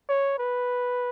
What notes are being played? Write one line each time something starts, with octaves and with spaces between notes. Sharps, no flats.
C#5
B4